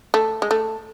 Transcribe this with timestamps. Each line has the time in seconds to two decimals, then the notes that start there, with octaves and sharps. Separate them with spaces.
0.14 A3
0.42 G#3
0.51 A3